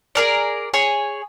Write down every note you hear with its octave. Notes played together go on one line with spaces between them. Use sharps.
G#4 A#4 D5
G#4 C#5 G#5